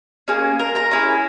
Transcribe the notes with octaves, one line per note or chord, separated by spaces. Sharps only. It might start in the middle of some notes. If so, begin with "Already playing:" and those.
A#3 C#4 G#4
A#4 A#5
A#4 A#5
C#4 E4 G#4